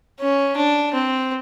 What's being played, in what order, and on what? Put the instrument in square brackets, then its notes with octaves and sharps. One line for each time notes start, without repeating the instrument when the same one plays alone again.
[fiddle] C#4
D4
C4